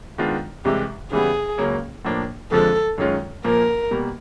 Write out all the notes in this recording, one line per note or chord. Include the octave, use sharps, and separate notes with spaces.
D#3 G#3 B3 D4 F4
C2 C3 E3 G#3 G4
C#3 E3 G3 B3 G#4
C#2 C#3 F#3 A#3 C#4
A2 F3 A#3 D4
F2 D3 F3 G#3 A4
F#2 D#3 G#3 C#4 F4
A#2 F3 A#3 A#4
B2 G3 A#3